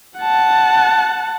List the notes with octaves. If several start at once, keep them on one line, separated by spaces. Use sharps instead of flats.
F#5 A5